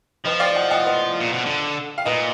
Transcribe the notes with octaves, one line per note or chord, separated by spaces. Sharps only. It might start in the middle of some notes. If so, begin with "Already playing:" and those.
F3 B4 D#5
D5 F5
D#5 F#5
D#5 F#5
B4 D#5
A#2
B2
D3
F5
A#2 B4 D#5